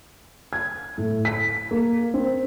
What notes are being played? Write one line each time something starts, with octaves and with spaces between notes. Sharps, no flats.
G#6
A2
B6
A#3
C4